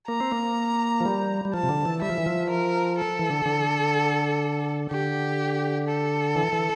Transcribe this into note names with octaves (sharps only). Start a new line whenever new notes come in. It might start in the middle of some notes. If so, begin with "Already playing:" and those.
A#3 A#5
C4
A#3
F3
G3
G3
F3 A5
C3
D3
E3
G3 E5
F3
E3
F3
A#4
A4
E3
D3
D3
D3 G4
A4
E3
E3